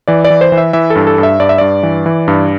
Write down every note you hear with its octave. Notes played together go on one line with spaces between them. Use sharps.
E3 D5
D5
E3
C5
E3
E5
E3 E5
A4
G2
A4
G2
E5
G2 D5
E5
G2 D5
E3
E3
G2